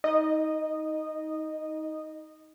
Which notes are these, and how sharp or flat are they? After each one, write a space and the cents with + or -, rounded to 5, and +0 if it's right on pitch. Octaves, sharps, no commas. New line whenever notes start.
D#4 +20 D#5 -15